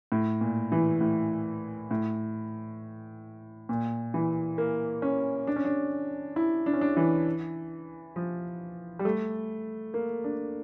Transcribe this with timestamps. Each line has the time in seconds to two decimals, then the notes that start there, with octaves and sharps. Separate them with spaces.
0.12 A2
0.41 A#2
0.72 E3
1.01 A2
1.91 A2
3.69 A#2
4.14 E3
4.58 A#3
5.02 C#4
5.47 D4
5.56 C#4
5.65 D4
6.36 E4
6.66 D4
6.73 C#4
6.81 D4
6.97 E3
8.16 F3
8.99 G3
9.05 A3
9.94 A#3
10.24 D4